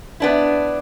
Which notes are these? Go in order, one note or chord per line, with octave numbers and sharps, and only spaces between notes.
B3 D4 E4